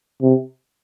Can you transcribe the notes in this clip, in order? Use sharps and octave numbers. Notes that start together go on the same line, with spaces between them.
C3